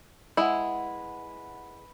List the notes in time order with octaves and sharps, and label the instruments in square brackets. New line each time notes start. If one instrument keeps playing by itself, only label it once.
[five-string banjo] G#3 E4 [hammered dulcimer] B4 F#5